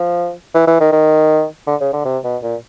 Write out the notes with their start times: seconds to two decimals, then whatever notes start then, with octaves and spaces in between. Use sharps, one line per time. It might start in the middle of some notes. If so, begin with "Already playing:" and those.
Already playing: F3
0.54 E3
0.67 E3
0.80 D#3
0.92 D#3
1.67 D3
1.81 C#3
1.93 D3
2.05 C3
2.24 B2
2.43 A#2